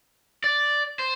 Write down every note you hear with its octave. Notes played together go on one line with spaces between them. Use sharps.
D5
C5